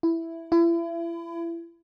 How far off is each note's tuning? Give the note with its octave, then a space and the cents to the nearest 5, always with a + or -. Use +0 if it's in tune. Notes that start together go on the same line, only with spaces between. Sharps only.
E4 +5
E4 +35